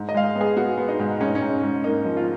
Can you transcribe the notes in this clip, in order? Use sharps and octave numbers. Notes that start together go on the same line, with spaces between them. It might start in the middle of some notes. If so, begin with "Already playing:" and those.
Already playing: G#2
D#5
G#3 F5
D#5
B3
G#4
B3 F#4
B3
D#4
G#2
G#2 C#4
D#4
C#4
G#2
G#2
A#3 D#4
F3
F4